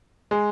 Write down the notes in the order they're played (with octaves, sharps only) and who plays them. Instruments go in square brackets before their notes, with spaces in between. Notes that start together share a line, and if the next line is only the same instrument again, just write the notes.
[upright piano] G#3